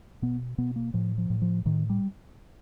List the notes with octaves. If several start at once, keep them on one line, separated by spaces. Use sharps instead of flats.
B2 B3
B2 B3
A#3
A2 F3
F3
A2
F3
A2 D#3
G3